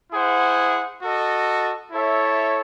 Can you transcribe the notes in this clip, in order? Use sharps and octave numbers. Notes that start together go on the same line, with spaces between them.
E4 G#4 C5 F#5
F#4 A4 D#5
E4 A4 C#5 E5